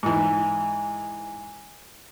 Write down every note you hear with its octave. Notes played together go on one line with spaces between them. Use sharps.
G#2 E3